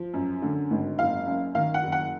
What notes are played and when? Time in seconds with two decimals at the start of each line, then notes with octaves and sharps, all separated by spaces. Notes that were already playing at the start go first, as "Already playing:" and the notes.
Already playing: F3
0.14 F#2
0.42 D3
0.70 G#1
0.99 F#1 F5
1.26 F#2
1.55 D#3 F5
1.74 F#5
1.83 F#1
1.92 F#5